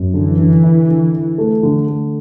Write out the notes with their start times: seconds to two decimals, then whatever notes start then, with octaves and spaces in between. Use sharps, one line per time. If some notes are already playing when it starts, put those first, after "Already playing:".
Already playing: F#2
0.14 D3 E3
0.38 D3
0.63 E4
0.88 D3
1.13 E4
1.38 A3
1.63 D3
1.88 A3